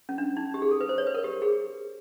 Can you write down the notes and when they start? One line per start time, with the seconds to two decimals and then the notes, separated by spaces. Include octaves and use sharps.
0.09 C#4
0.18 D4
0.37 D#4
0.54 G4
0.62 G#4
0.71 A4
0.81 B4
0.89 C5
0.98 C#5
1.07 B4
1.15 A#4
1.24 G4
1.42 G#4